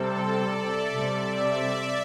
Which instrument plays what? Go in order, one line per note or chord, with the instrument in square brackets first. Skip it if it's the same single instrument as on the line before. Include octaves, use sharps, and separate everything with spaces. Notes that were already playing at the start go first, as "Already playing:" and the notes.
Already playing: [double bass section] C3 G3 C4 [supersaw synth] A4
[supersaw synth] D5
E5
[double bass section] C3 G3 C4 [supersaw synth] D5
[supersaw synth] E5
D5